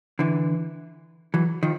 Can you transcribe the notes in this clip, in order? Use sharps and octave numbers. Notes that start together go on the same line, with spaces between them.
D3 E3
E3 F#3
D#3 F3